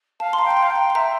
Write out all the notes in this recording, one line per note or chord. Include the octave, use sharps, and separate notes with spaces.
F5 A5
C6
A#5
G5
A#5
C6
F5
G5
A#5
C6
E5 A#5